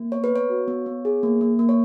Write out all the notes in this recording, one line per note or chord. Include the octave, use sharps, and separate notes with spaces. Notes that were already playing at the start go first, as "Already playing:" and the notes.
Already playing: A#3
B3 C#5
B4
B3 C#5
F#4
B3
B3
G#4
A#3
A#3
A#3
C#5